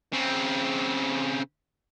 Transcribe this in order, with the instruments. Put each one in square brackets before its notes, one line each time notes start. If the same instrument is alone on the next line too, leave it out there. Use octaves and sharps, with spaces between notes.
[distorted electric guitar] C#3 C4